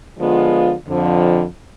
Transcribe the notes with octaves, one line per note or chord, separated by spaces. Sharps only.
D3 F3 G#3 B3 F4
F2 D3 F3